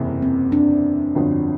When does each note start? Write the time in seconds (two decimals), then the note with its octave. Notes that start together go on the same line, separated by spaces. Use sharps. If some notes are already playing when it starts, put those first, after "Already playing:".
Already playing: F#1 E2 C3 E3
0.22 C4
0.52 D4
1.15 G1 F2 D3 F#3